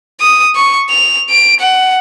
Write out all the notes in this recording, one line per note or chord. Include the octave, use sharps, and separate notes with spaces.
D#6
C#6
F7
D7
F#5